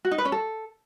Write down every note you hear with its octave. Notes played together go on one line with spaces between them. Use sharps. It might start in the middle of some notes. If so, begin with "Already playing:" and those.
F#4
D#4
B4
C#4
A4